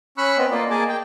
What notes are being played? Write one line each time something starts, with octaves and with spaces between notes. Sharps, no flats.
C#4 B5 C#6 E6 F#6
B3 C4 D#5
A#3 F4 D5 D#5
A#3 G#4 D#5 G#5 A5 D6
G5